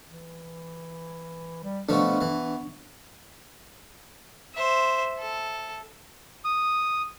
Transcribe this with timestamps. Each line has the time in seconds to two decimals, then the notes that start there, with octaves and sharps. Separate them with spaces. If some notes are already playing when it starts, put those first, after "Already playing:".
0.10 E3
1.64 G3
1.89 B2 F3 A3 B3 D4 C#6
2.21 E3
4.54 C5 E5
5.19 A4
6.45 D#6